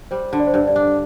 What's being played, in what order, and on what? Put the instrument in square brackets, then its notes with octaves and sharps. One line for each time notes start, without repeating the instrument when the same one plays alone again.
[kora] G3 [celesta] C5
[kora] D3
[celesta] D5
C5
[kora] G2 [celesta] D5
[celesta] D5
[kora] D4